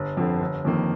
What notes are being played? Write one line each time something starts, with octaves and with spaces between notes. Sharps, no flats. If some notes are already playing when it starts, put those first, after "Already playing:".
Already playing: G1
F2 D3
G1
F2 D#3 A#3